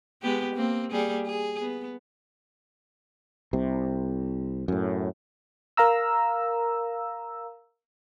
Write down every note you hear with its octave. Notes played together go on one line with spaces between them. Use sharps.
G#3 B3 G4
A#3 C4
G3 A#3 G#4
G#4
B3
C2 C3
F#2 A2
A#4 F5 A#5 E6